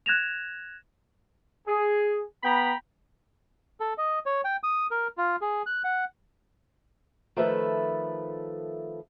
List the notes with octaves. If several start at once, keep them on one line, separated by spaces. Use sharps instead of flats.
F#6 G#6 A#6 E7 F7
G#4
B3 G5 A#5 B5
A4
D#5
C#5
G5
D#6
A#4
F4
G#4
F#6
F#5
D#3 F3 A3 A4 B4 E5